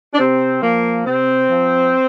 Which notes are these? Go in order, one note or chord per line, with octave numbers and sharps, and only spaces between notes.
D4
C3 C4
F3 A#3
C3 C4
F3